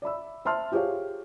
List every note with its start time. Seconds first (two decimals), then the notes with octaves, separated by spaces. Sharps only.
0.02 D5 E5 B5 E6
0.45 C5 E5 A5 C6 F6
0.72 F4 G4 G#4 C5 C#5 F5